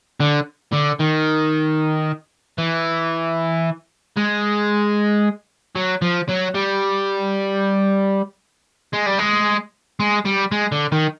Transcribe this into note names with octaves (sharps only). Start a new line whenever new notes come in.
D3
D3
D#3
E3
G#3
F#3
F3
F#3
G3
G#3
G3
G#3
G#3
G3
G#3
D3
D#3